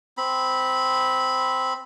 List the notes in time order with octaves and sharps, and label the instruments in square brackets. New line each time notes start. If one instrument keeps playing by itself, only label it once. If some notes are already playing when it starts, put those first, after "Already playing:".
[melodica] C4 B5